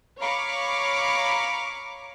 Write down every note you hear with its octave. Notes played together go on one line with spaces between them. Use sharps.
C#5 F5 A#5 B5 C#6 D6